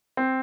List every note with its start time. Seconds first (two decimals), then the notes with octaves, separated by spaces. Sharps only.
0.17 C4